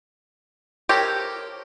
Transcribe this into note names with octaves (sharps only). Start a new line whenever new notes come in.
G4 A4 A#4 C5 C#5